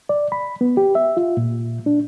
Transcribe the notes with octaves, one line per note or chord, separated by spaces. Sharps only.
D5
B5
B3
G4
E5
F4
A#2
D4